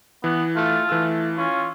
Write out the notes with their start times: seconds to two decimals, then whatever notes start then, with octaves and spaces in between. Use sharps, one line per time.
0.24 E3 B3
0.56 A3 F4
0.89 E3 A3 E6
1.38 C#4 F4